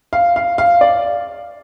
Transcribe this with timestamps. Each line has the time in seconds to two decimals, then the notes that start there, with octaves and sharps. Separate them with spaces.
0.13 F5
0.36 F5
0.58 F5
0.81 D5